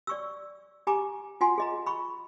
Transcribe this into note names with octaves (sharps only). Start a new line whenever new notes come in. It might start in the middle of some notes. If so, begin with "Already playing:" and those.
D5 C#6 E6
G4 G#5 A#5 D6
F4 F#5 G#5 C6
G#4 D#5 A#5
B5 C#6